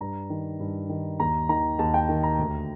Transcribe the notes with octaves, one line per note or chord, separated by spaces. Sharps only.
G2 A#5
D#3
G2
D#3
D#2 A#5
D#3 A#5
D#2 A5
G5
D#3
A#5
D2